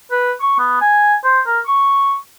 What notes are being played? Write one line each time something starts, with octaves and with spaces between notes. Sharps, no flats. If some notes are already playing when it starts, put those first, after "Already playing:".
B4
C#6
B3
G#5
C5
A#4
C#6